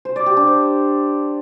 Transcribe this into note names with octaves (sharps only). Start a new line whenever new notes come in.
C5
D5
G4
D4
C5